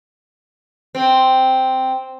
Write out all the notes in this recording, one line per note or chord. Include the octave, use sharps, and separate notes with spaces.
C4